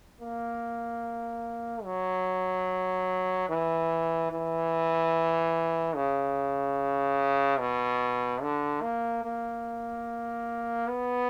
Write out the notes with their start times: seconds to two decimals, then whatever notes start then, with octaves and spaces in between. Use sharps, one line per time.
0.21 A#3
1.84 F#3
3.49 E3
4.31 E3
5.95 C#3
7.59 B2
8.42 D3
8.82 A#3
9.24 A#3
10.88 B3